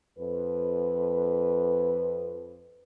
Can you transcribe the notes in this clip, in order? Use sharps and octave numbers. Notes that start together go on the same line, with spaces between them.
F2 B4